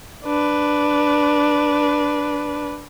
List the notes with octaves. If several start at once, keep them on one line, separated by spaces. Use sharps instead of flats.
D4 B4